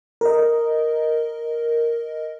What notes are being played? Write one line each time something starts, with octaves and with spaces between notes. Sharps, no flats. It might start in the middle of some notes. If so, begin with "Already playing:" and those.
A#4 D#5